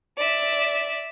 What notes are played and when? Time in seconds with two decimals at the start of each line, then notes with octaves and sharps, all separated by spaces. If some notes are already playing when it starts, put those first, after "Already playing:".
0.17 D5 E5